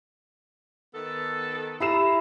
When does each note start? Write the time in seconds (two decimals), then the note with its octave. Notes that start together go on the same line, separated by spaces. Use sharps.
0.94 D#3 B3 A4
1.80 E4 G4 A#5 E6 C7 E7